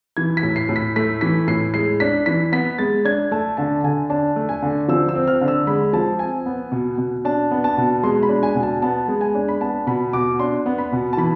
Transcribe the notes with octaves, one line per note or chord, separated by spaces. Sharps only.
E3 G#6
B6
A2
C7
A2
B6
A3 B6
E3 B6
A2 C7
G#3 C7
D4 B6
E3 B6
B3 B6
G#3 A6
D4 G#6
A3 A5
D3 A5
D3 G#5
D4 A5
A3
G#5
D3
F3 E6
E6
C4
F6
D3
E6
G#3 B5
F3 A5
C4 G#5
B3
B2
B2
D4 A5
B3
A5
B2
G#3 C6
B5
D4
G#5
B2
A5
B3 A5
G#3
G#5
D4
B5
B3 A5
B2 B5
B2 D6
D4 C6
B3
B5
B2
A5
E3 B5